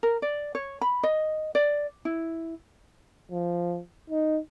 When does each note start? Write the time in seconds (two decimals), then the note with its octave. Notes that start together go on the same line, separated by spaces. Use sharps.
0.03 A#4
0.22 D5
0.55 C#5
0.81 B5
1.03 D#5
1.55 D5
2.05 E4
3.32 F3
4.10 D#4